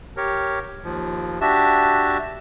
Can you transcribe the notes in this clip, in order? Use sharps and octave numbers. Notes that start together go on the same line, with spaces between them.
G4 A#4 C#5
D#2 F3
D4 F#4 G4 E5 A5